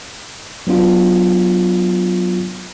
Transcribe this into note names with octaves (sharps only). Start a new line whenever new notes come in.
F#3 B3 D4 F4 F#4